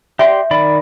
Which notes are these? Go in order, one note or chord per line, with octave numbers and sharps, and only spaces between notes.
G4 D5 E5 C6
D#3 D5 B5